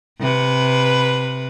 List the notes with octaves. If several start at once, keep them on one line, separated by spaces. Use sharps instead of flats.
C3 B4